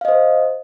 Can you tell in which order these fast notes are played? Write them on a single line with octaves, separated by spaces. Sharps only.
F5 D#5 C5